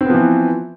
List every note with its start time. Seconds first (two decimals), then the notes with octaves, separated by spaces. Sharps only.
0.01 C4
0.05 B3
0.10 F3
0.14 E3